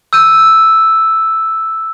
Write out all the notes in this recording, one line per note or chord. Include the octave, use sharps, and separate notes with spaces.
E6 G6 D#7